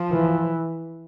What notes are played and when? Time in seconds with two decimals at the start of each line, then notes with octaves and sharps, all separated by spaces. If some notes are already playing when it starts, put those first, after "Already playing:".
Already playing: F3
0.12 E3